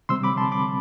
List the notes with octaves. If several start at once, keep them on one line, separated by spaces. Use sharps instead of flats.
C3 G3 C4 C6 E6
B5 D6
A5 C6
B5 D6